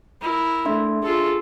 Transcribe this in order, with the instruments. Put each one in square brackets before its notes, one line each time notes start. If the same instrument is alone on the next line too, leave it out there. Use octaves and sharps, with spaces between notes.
[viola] E4 A#4
[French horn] A3 [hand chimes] D4 E5 C6
[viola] F4 A4 [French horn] G#4